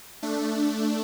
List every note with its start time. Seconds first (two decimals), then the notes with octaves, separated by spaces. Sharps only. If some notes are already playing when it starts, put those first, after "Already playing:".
0.23 A3 D4